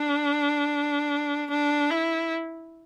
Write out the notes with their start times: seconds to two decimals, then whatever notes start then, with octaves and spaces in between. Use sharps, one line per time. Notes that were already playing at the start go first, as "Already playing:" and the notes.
Already playing: D4
1.50 D4
1.90 E4